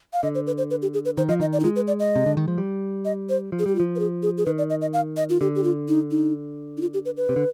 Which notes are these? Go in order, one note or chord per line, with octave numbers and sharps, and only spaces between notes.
F5
D3 D#5
C5
B4
C5
B4
G4
G#4
B4
D#3 C5
F3 D#5
D#3 D#5
D5
D#4
G#3 F4
B4
D5
D#5
C3
D3
D#3
F3
G3
D#5
C5
F3
G#4
G3 G4
F4
F3
B4
G#4
G#4
G#4
D#3 B4
D5
D#5
D#5
F5
D#5
F4
D3 G4
G4
F4
D#4
D#4
D#4
F4
G4
B4
B4
C3
D3